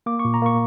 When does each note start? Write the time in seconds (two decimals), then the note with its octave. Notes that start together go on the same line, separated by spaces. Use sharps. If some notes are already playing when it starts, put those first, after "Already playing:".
0.06 A#3 D6
0.19 C#6
0.25 A#2
0.34 A#5
0.42 A#3 C#6